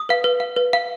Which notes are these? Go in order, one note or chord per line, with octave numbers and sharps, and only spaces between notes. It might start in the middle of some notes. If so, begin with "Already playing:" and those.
Already playing: D#6
B4 F5
B4
F5
B4
F5